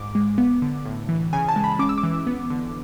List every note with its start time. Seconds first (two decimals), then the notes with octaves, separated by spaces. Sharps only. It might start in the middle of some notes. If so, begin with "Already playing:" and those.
Already playing: G#2 D6
0.15 G#3
0.38 B3
0.62 D3
0.85 A2
1.09 E3
1.33 C#3 G#5
1.49 A5
1.56 G#3
1.64 B5
1.79 C#4 D6
1.89 E6
1.98 D6
2.03 E3
2.27 B3
2.50 D3